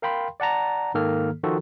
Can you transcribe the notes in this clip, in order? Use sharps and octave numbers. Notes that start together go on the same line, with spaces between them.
A#4 F5 G5 B5 C6
D5 F#5 A5 A#5
G#2 D#3 A#3 A4 F6
D#3 F3 F4 F#4 A4